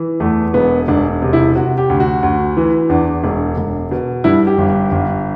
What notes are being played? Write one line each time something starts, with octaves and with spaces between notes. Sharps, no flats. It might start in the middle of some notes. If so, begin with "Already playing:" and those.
Already playing: E3
E2 A3
E1 B3
E1 D4
C3
E4
C3 F#4
G4
D2
F#4
D2
E3
E2 D4
E1
E1
B2
G2 E4
G4
G1
G4
G1